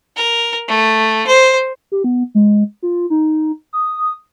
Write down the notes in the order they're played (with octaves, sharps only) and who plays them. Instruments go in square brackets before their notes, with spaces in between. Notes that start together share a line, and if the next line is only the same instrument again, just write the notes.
[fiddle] A#4
A3
C5
[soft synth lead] G4
B3
G#3
F4
D#4
D#6